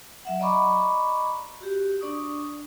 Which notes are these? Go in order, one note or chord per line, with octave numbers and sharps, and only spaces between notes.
F#3 E5 F#5
D5 D#5 A#5 B5 C#6 D6
F#4 G4
D4 D5 C#6 D#6